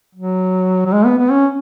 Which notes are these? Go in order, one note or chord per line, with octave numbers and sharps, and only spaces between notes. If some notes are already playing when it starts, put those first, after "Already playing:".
F#3
F#3
G#3
B3
B3
C#4